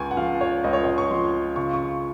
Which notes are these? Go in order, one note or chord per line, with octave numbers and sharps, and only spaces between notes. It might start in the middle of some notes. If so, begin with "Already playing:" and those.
Already playing: C#2 G#5 C#6
F#5
F3 F5
C#5
C#2 D#5
C#5
D#5
C#6
F3 C6
C#3 C#6
C#6